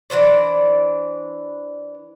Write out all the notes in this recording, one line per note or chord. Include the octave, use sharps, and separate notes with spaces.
E3 D4 C5 D5